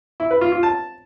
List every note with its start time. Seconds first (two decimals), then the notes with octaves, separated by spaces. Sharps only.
0.20 E4
0.31 B4
0.41 F4
0.52 F4
0.63 A5